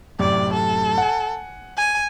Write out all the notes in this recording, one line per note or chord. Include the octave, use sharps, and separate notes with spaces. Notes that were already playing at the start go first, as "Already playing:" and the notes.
F#2 A2 C3 D5
A4
F#5 G#5
G#5